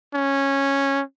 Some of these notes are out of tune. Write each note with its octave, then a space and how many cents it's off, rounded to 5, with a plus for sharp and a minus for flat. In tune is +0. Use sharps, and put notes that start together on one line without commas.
C#4 -10